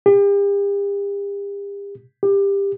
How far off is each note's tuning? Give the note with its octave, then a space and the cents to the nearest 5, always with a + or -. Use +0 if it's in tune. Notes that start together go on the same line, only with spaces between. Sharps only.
G4 +40
G4 +20